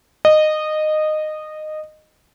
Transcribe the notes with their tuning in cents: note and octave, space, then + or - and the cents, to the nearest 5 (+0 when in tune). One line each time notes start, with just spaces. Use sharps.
D#5 -15